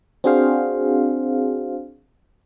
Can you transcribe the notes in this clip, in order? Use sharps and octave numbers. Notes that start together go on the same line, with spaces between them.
C4 D4 F#4 G#4 C5 F5